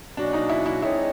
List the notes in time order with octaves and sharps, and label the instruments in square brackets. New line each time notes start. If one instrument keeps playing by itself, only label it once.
[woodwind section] B2 F#3 A#3 C#4 F#4 [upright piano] D4
[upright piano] D#4
E4
E4
[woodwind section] G#3 C4 D#4 G#4 C#5 [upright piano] E4